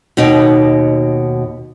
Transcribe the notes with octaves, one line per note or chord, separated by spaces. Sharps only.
D#2 B2 D#4